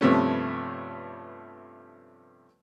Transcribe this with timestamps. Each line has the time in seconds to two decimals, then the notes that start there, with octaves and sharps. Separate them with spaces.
0.01 G2 C3 F3 A3 B3 C#4